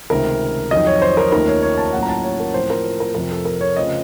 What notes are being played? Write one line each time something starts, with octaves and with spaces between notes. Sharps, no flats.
C#2 C3 D#3 A3 A#4
F2 D#3 F#3 D#5
C#5
C5
A#4
D#2 D#3 A3 C#4 F4 A#4
C#5
C#5
A5
A2 F#3 A#3 C#4 F4 F#5
A#5
A5
C#5
A#4
A2 F3 C4 F4 C5
A#4
C5
A#4
F2 C3 F3 C4 A#4
A4
A#4
C#5
C#3 A3 C4 F4 D#5